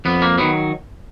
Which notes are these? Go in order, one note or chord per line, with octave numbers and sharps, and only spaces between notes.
F2 B3
A#3
D#3 F#3 B3